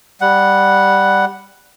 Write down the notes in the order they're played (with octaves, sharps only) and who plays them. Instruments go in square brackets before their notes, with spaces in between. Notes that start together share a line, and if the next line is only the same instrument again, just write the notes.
[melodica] G3 F#5